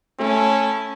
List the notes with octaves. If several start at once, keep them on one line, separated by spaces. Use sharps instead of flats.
A3 C#4 E4 A5